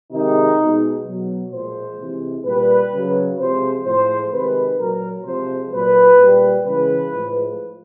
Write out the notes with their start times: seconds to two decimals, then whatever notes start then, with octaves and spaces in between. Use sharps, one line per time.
0.12 C3 D#3 G#3 D#4
0.58 B2 G#3
1.05 B2 F#3
1.52 A#2 F3 G#3 C5
1.99 C3 E3 G#3
2.45 A#2 G3 B4
2.92 C#3 F#3
3.39 C3 F3 G#3 C5
3.85 A2 F3 G#3 C5
4.32 C3 D#3 G#3 B4
4.79 A#2 F#3 A#4
5.25 C3 F3 G#3 C5
5.72 A#2 F#3 B4
6.19 A#2 G3
6.65 C#3 E3 G#3 B4
7.12 A2 F3 G#3